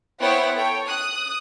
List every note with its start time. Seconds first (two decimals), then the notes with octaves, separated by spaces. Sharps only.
0.21 B3 E4 C5 C#5 F#5 G5
0.56 A4 C#5 G5
0.88 D#6 F#6